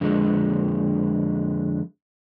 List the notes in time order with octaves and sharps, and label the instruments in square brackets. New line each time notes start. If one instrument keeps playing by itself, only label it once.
[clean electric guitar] F2 D3 G#3